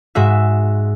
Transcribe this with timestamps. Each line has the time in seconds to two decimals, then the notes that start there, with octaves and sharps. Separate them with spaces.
0.15 G#2 G#3 F#4 E5